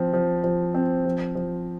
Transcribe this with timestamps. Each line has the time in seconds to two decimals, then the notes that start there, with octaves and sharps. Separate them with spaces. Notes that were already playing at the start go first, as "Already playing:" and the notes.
Already playing: F3 C4
0.13 F3
0.44 F3
0.75 C4
1.05 F3
1.35 F3